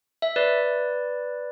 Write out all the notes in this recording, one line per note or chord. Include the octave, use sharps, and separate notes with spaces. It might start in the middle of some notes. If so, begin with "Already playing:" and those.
E5
B4 D5